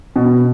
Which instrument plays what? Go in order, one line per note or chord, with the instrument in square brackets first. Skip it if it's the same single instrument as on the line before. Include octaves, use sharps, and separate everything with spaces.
[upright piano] B2